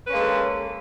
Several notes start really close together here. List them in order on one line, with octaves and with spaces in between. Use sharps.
B4 C#4 A#3 G#3 A4